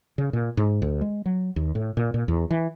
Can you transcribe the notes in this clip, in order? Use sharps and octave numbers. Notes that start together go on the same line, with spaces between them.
C#3
A#2
G#2
D2
G#3
F#3
D#2
A2
A#2
A#2
E2
E3